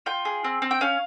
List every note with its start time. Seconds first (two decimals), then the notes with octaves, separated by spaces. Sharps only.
0.06 F4 G5
0.25 G#4
0.44 C4
0.62 C4
0.71 G5
0.81 C#4 F5